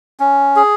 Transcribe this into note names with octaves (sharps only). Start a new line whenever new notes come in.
C#4
G#4